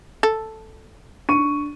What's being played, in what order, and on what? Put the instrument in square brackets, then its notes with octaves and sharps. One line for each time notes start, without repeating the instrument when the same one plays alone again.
[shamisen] A4
[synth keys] D4 [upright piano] C#6 D#7